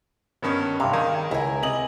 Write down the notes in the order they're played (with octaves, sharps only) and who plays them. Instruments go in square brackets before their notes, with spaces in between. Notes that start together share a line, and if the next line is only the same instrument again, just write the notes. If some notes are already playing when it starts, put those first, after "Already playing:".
[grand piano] G2 D#3 C#4 [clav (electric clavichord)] B3
[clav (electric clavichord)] G2 C3 [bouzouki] F5
[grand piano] D#3 [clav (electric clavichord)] G#4
[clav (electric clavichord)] C#2 [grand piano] E4 [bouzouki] A#4 G#5
[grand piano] C3 D#5 F#7